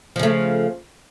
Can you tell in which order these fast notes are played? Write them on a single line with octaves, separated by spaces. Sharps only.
F3 C#3 A3